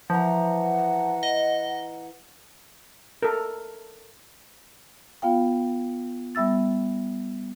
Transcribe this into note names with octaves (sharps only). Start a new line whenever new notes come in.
E3 F3 F#5 A#5
D#5
A4 A#4
B3 F4 F5 G5
G3 B3 E5 E6 A6